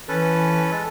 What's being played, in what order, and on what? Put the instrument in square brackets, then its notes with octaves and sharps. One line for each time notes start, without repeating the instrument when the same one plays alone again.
[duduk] E3 [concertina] C#4 A4 B4
[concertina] G#3 A4